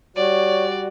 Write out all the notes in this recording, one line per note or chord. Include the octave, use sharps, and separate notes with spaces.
G3 F#4 C#5 D5